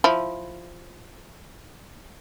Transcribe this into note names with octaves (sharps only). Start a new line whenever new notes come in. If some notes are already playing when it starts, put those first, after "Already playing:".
F3 E4